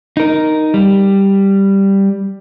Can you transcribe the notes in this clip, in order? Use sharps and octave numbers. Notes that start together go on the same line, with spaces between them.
D#4 A#4
G3